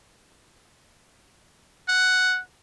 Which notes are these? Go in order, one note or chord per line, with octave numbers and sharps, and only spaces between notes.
F#5